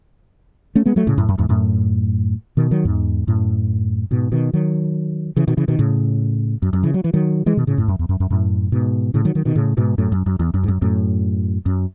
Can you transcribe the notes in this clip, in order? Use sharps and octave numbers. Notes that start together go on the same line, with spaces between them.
A3 C#4
G#3 B3
F#3 A3
A2 C#3
F#2 A2
F#2
E2 G#2
F#2 A2
B2 D#3
D#3 F#3
E2 G#2
F#2 A2
G#2 B2
B2 D#3
D#3 F#3
C#3 E3
B2 D#3
C#3 E3
B2 D#3
A2 C#3
F#2
F#2
C#3 E3
F#3
E3
D#3 F#3
E3 G#3
B2 D#3
A2 C#3
F#2 A2
F#2
E2
F#2
F#2
F#2 A2
G#2 B2
A2 C#3
D#3 F#3
D#3 F#3
B2 D#3
A2 C#3
G#2 B2
F#2 A2
F#2
F#2
E2
F#2
G#2
F#2
F#2 A2
F#2